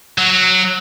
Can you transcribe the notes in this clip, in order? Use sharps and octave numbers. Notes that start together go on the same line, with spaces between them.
F#3